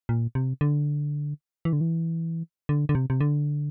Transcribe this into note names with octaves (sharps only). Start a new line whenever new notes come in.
A#2
C3
D3
E3
D3
E3
D3
D3
C3
C3
D3